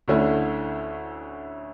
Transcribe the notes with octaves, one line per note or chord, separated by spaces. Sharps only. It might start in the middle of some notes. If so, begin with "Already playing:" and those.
D2 D3 A3 C#4 E4